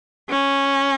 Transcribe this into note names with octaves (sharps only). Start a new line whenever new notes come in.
C#4